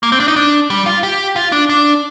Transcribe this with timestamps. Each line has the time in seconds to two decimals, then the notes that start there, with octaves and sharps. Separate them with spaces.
0.03 A#3
0.12 C4
0.20 D4
0.28 D#4
0.36 D4
0.70 G3
0.86 F4
1.03 G4
1.36 F4
1.52 D4
1.69 D4